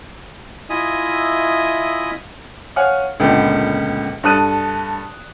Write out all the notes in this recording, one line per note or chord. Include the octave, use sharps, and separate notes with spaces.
E4 F4 D#5 E5 G#5 D#6
C#5 F5 F#5 G#5 F6
C#2 A#2 D3 B3 G5
G2 A4 D#6 F#6 D#7